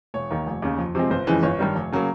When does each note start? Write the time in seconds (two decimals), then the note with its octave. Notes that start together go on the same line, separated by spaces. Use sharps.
0.14 E1 C#5
0.31 D#2 D#3
0.46 F1
0.62 D#2 C#3
0.78 F2
0.95 C3 F3 G#3 C4
1.10 G1 C5
1.27 F2 C#3 E3 G#3
1.43 G1 C#5
1.59 G2 D#3 G3
1.75 F1
1.92 C#3 F#3 A#3